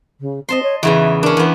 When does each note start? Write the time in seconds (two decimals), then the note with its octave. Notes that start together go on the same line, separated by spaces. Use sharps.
0.20 C#3
0.49 C4 D#5 A5 C6
0.63 C#5
0.83 E2 C#3 E3 E5
1.23 C#4 D4 A#4
1.37 E2 B3